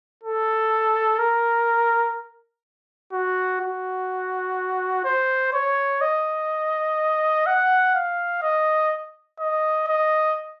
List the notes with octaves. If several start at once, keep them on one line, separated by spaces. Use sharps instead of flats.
A4
A#4
F#4
F#4
C5
C#5
D#5
F#5
F5
D#5
D#5
D#5